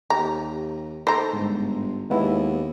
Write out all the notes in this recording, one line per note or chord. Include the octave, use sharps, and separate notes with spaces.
D#2 G4 A#5
D#4 A4 C5 A#5
G1 G#2
D#2 G#3 B3 E4